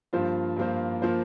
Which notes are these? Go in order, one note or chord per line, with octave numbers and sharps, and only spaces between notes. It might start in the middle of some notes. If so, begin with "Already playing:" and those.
G2 F3 A#3 F4 C5
G2 F3 A#3 F4 C5
F3 A#3 F4 C5